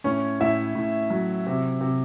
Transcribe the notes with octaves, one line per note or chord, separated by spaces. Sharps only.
A2 C#4 C#5
A2 E4 E5
A2
F#3
C3
C3